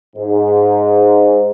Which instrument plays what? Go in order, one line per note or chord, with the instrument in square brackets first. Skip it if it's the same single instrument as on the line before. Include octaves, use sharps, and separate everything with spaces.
[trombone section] G#2